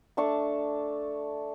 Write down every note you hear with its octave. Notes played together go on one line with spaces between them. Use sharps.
A3 D4 A5 C#6